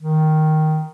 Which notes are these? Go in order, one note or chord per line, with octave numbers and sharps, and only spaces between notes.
D#3